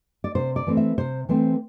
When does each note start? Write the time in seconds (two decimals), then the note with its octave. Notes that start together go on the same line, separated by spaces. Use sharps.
0.24 D5
0.35 C3 C5
0.56 D5
0.67 E3 A3 C4
0.77 E5
0.98 C3 C5
1.29 E3 A3 C4 C5